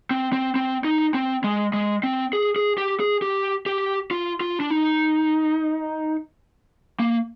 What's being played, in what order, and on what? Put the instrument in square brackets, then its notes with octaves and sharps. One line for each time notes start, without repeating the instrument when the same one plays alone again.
[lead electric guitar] C4
C4
C4
D#4
C4
G#3
G#3
C4
G#4
G#4
G4
G#4
G4
G4
F4
F4
D4
D#4
A#3